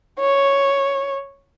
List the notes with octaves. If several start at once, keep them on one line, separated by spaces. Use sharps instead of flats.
C#5